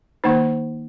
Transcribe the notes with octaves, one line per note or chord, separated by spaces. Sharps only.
D#3 A#3 D#4 C5